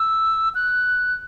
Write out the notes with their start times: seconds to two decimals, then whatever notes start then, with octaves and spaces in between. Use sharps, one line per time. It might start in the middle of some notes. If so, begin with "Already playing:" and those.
Already playing: E6
0.55 F#6